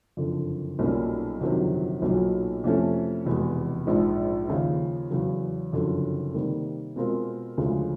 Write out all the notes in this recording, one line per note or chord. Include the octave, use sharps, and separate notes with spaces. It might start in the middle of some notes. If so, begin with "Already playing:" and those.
F#1 F2 D3
B1 A#2 G3 A#3 C#4
G1 F2 C3 D#3 F#3
B1 A#2 F#3
F2 C3 E3 A3 C#4
F1 E2 B2 G#3
A#1 G#2 F3 G#3
D#2 C#3 F3
E2 C#3 F#3
F#1 F2 D3 F#3
C3 D#3 G3 A#3
B2 G#3 C4 F4 A#4
D2 C#3 F3 G#3